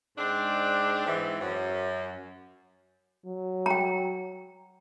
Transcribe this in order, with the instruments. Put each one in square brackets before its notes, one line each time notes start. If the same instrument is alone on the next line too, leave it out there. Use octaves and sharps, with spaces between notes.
[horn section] G#2 G#3 C4 D4
G#2 E3 C4
F#2
[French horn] F#3
[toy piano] G5 A#5